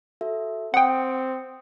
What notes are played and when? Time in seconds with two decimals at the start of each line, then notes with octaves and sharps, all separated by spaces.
0.21 F#4 A4 E5
0.74 C4 F#5 G5 D#6 C#7